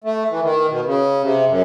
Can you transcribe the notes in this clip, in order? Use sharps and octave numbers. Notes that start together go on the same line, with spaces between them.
A3
E3
D#3
B2
C#3
C3
F#2